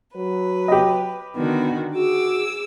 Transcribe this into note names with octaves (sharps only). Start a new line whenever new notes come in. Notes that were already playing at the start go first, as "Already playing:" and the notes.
F#3 B4
G4 D#5
D3 D#3 B3 F#4
F#4 G#4 D6 E6